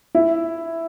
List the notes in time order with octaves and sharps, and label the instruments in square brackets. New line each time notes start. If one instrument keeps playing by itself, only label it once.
[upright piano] E4